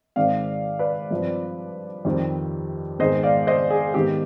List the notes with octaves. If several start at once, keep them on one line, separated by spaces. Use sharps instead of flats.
G#2 D#3 G#3 C4 D5 F5
B4 D5
G2 F3 C4
F2 D#3 G3 C4
G#2 D#3 G#3 B3 C5 D#5
D5 F5
C5 D#5
G#4
G#2 D#3 B3 G4